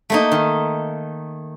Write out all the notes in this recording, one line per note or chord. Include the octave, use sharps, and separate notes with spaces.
A3 A#3 D#4
D#3